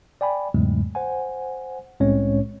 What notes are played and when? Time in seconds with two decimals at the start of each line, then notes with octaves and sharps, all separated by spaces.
0.21 D5 G5 G#5 B5
0.54 E2 G#2 C#3 F#3 G#3 A3
0.95 C5 F#5 G#5
2.00 C2 A2 G#3 C4 C#4 C#5